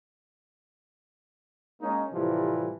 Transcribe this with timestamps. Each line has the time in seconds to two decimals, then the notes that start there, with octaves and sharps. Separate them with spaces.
1.81 G#3 A#3 C#4 D#4
2.13 A2 C3 E3 F3 G3